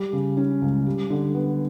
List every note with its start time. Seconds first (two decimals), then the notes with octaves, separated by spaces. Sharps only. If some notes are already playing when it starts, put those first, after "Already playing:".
Already playing: G3
0.13 C#3
0.37 C#4
0.62 C#2
0.86 G3
1.10 D3
1.35 B3